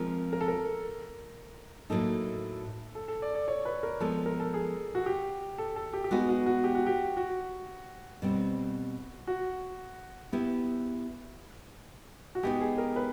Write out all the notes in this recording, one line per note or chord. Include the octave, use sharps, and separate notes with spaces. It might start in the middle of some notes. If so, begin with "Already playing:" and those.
Already playing: F3 G#3 C4 F4 A#4
A#4
A4
A#4
A2 F#3 A#3 D#4 A4
A4
A4
D5
D5
C#5
B4
A#4
F3 G#3 B3 A4
A#4
A4
G#4
F#4
G4
A4
A4
G4
G4
G#3 B3 D#4 F#4
F#4
F#4
G4
F#4
G4
F#4
B2 G3 C4
F#4
B3 E4 G4
F#4
G#3 B3 D#4 G4
G#4
A#4
B4